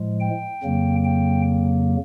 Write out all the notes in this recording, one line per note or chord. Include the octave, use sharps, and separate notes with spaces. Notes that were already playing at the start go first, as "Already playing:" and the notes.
Already playing: A2 F3 G#3
G5
F2 C#3 F#3 A#3
G5